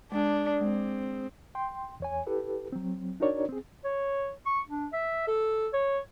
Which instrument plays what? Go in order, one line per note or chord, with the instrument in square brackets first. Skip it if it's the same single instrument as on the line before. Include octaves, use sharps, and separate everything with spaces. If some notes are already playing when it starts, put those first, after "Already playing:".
[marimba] G#3 [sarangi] D4 [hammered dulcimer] G#4 D5
[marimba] G#3 [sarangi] C4
[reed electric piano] G5 C6
E2 C#5 G#5
E4 G4 A4 B4
F#3 C4
D4 D#4 F#4 A#4 C#5 D5
C4 G#4
[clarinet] C#5
C#6
D4
E5
A4
C#5